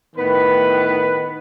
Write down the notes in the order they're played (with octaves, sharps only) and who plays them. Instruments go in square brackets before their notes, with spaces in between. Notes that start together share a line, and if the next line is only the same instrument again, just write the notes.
[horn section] A2 D#3 B3 B4